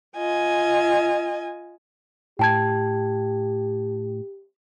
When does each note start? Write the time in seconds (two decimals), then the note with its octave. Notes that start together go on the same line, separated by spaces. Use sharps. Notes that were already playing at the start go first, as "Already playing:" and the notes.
0.17 F4 D#5 G#5
2.39 A2 G4 G5 A5 G#6